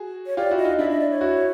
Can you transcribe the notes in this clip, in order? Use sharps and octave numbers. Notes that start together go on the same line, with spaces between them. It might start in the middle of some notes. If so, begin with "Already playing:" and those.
Already playing: F#4 G#4
C#5
F4 G4 D5
E4 F#4
D#5
D#4 F4
D4 E4 E5
D#5
D5
C#5
E4 F#4